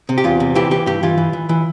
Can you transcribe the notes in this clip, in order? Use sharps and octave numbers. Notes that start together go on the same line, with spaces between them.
C3
G4
E2 F4
C3
E3 G4
E3 G4
G2 G4
E3 F4
E3
E3
E3